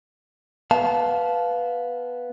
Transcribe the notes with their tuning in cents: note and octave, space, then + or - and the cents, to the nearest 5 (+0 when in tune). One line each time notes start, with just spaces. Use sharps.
B3 +0 F5 +0 A5 -20